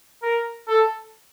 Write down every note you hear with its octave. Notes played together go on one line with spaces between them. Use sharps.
A#4
A4